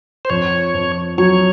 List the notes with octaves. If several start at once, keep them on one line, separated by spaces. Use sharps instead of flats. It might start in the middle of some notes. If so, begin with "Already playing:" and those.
C5
F2 C#5
F2
F#3 C#5